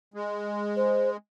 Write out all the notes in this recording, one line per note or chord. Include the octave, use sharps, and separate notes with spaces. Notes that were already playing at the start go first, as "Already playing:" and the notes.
G#3
C5